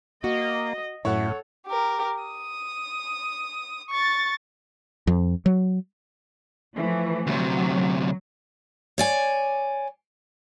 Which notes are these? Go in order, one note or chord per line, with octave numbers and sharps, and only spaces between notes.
A#3 F#4 D#5
F#2 A2 A3 E4 A4 C#5 F#5
G4 A#4
D#6
C#6 A6
F2
F#3
E3 F3 A3
D2 C3 F#3
C#5 D5 G#5